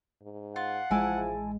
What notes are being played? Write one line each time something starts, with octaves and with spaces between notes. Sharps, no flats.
G#2
F4 F#5
A1 F3 G#3 E4 G#5 A5